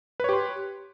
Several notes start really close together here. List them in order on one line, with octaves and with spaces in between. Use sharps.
B4 C#5 G4 C6